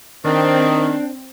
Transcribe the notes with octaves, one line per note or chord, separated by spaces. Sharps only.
D#3 C4 D4